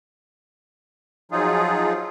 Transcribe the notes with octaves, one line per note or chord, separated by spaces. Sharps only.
F3 F#3 D#4 F4 G#4